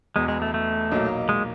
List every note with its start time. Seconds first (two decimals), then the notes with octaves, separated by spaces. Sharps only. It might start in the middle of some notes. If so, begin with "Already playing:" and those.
0.16 E1 E2 B2 G#3
0.28 G#3
0.42 A3
0.54 A3
0.91 B1 A#2 F#3 A#3 D#4
1.29 G#3